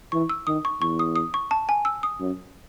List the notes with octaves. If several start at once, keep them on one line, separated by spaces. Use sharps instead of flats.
E3 C#6
E6
D#3 D#6
C#6
E2 C#6
D#6
D#6
C#6
A5
G#5
E6
D#6
F#2